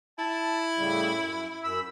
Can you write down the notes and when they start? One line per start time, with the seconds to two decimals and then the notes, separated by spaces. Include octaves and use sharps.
0.19 E4 A5
0.77 A2 C#3 G3
1.15 F#2
1.63 F#2 B5 E6